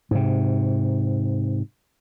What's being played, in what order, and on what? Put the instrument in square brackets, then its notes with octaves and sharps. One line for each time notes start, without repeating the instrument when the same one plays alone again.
[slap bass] G#2 C3